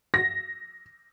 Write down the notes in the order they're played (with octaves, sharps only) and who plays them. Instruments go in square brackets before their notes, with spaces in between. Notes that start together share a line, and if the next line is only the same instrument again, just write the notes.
[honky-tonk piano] A#6